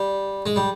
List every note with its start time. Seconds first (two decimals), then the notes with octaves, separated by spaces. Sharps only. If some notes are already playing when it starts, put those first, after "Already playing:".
Already playing: G3
0.46 G#3
0.56 G3